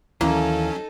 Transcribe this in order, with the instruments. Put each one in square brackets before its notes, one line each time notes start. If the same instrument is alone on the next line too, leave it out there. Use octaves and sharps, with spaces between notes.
[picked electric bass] D#2 E3 [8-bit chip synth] F#3 C#4 [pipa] A#3 [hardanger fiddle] D#4 A4